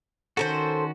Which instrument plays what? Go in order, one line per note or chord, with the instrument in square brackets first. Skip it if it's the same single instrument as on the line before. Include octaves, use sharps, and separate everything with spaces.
[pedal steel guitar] D#3 C#4 F#4 [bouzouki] A4 A#4 C5